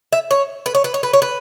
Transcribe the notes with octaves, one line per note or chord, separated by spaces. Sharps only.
E5
C#5
B4
C#5
B4
C#5
B4
C#5
B4